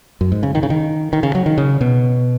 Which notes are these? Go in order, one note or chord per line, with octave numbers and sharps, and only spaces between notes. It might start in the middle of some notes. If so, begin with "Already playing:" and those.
F#2
G#2
C#3
D#3
C#3
D#3
D#3
C#3
F#3
D#3
C#3
B2